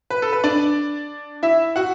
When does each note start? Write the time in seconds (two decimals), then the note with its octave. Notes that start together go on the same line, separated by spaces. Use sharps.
0.10 B4
0.22 A4
0.33 B4
0.43 D4 D5
1.43 E4 E5
1.76 F#4 F#5